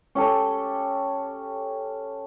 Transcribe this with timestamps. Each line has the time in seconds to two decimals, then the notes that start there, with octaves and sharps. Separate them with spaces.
0.15 C#4 G4 A4